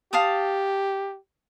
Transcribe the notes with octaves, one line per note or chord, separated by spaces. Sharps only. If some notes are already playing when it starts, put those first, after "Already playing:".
G4 F5 A5 D#6